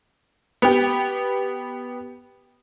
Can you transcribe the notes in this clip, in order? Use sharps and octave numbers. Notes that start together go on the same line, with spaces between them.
B3 G4